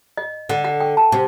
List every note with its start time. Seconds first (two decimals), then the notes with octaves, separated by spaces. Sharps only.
0.17 D#5
0.49 D3 F#5
0.64 F#5
0.80 G5
0.97 A5
1.12 C3